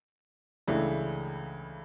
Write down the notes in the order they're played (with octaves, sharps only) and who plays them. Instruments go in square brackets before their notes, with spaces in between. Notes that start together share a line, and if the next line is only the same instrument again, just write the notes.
[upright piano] C#2 C#3 E3 A3 D4